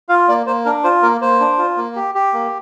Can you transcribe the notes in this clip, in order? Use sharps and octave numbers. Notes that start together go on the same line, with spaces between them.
F4 F5
A#3 D5
A#3 C5
D4 A#4
F4 C5
A#3 A#4
A#3 C5
D4
F4
A#3
G4
G4
A#3